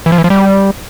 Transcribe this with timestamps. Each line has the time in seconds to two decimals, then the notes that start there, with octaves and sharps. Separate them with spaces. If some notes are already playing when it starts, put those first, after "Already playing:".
0.06 E3
0.12 F3
0.18 E3
0.24 F3
0.30 G3